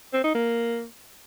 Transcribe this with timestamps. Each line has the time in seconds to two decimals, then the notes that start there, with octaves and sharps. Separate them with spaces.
0.14 C4
0.24 D#4
0.35 A#3